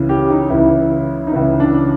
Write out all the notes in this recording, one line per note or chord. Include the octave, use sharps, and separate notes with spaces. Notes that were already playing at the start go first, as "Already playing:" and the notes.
Already playing: C#2 C#3 E3
G4
D#4
C#2 C#3 E3 E4
D#4
C#2 C#3 E3 E4
D4